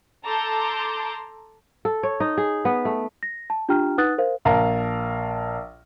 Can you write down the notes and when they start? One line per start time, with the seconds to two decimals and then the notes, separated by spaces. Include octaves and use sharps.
0.25 A4 A5 A#5 C6 D6 G6
1.85 A4
2.03 C#5
2.20 D#4
2.37 G#4
2.65 B3
2.85 A3
3.23 A#6
3.50 A5
3.69 D4 F4 G4 G5 A#5 F6
3.98 D#4 B4 F#5 D#6 F#6 A6
4.18 A#4 C5 F5
4.45 A#1 A#4 F5 A5 A#5